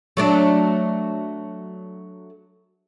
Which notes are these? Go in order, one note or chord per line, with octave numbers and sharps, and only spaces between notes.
F#3 A3 D4